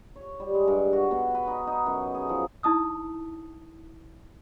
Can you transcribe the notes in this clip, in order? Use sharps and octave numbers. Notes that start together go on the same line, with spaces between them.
C#5
G3
G#3
G2
F#4
B2
B4
D#4
D#4
F#2
G#4
F3
D#4 E4 A5 D#6 E6